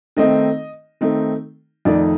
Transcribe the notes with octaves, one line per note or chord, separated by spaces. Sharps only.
D#3 A3 C4 D#4 D#5
D#3 A3 C4 D#4
F2 D#3 A3 D#4 D5